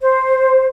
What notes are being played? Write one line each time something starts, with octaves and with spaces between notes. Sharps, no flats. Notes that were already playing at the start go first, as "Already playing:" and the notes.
C5